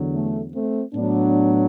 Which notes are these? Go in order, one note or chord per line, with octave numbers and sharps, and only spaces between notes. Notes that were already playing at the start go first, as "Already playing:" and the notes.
Already playing: E2 D3 F#3
A3
A3 C4
A2 F#3 B3 D4